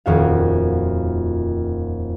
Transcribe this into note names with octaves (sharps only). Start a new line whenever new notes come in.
D#1 F2 F#4 F5